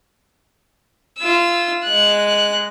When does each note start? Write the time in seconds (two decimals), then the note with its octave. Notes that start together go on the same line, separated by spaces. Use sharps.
1.19 F4 E6
1.84 G#3 F#6